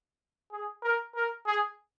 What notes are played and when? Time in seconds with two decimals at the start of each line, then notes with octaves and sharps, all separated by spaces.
0.52 G#4
0.82 A#4
1.15 A#4
1.46 G#4